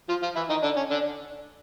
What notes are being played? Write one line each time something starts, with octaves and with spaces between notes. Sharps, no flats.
F3 F4
F3 F4
E3 E4
D#3 D#4
D3 D4
C#4
D3 D4